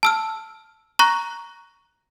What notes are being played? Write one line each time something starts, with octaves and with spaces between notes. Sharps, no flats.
A5 E6 F6
A#5 C#6 F#6 A#6